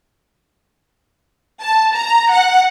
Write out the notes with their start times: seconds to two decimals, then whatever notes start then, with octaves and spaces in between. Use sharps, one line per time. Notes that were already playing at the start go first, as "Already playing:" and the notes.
1.62 A5
1.95 A#5
2.32 F#5